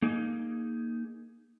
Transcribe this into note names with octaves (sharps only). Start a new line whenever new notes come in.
A#3 D#4 G#4